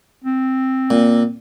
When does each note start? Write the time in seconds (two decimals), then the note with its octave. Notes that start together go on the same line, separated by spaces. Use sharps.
0.24 C4
0.90 A#2